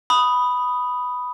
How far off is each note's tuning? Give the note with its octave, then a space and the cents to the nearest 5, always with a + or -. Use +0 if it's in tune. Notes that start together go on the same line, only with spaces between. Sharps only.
B5 +0 D#6 +0